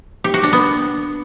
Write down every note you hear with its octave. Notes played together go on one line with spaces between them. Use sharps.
G4
F#4
D4
B3